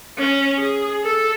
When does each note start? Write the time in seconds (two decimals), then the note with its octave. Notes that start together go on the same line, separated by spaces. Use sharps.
0.18 C#4
0.59 G#4
1.03 A4